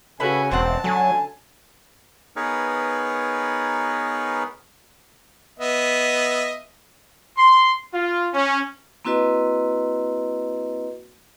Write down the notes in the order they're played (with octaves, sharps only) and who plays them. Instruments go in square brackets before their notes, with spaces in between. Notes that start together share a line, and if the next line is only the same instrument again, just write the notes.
[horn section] C#3 G#5 [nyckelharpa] C#4 F#4 [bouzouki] E4 A4 B4
[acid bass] E1 [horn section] C4 [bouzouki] C5 F#5 [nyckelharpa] A5
[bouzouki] D3 [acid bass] F#3 [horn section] G#5
[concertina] B3 D#4 G#4 A#4 B4 C#5
[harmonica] B3 D#5 E5
[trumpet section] C6
F4
C#4
[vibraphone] A#3 C4 E4 F#4 B4 D#5